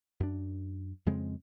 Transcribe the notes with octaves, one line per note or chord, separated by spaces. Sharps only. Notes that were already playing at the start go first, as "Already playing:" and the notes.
F#2 D4
F2 C#3 G#3 C4